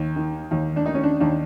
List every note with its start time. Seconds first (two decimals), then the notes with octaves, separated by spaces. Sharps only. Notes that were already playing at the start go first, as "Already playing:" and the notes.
Already playing: D#2
0.16 D#3
0.51 D#2
0.76 D4
0.85 D#3 D#4
0.95 C#4
1.03 D4
1.20 D#2 D4